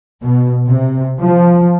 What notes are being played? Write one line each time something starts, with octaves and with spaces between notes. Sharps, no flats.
B2
C3
F3